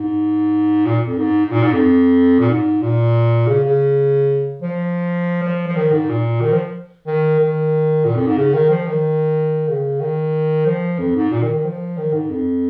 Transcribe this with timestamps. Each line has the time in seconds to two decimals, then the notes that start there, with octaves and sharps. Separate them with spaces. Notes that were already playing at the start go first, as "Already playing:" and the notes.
Already playing: G#2
0.86 A#2
1.07 F2
1.18 G#2
1.46 G#2
1.51 A#2
1.62 G#2
1.73 F2
2.39 A#2
2.49 G#2
2.82 A#2
3.47 C#3
3.64 C#3
4.62 F3
5.43 F3
5.68 F3
5.76 D#3
5.92 G#2
6.09 A#2
6.41 D#3
6.52 F3
7.06 D#3
7.39 D#3
8.05 A#2
8.16 F2
8.27 G#2
8.37 C#3
8.54 D#3
8.70 F3
8.86 D#3
9.69 C#3
10.01 D#3
10.67 F3
10.99 F2
11.15 G#2
11.32 A#2
11.42 D#3
11.54 D#3
11.64 F3
11.97 D#3
12.13 G#2
12.30 F2